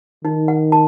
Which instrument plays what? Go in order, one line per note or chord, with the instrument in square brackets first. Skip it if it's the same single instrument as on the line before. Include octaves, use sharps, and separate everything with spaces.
[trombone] D#3 [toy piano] D#4
[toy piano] F#5
A5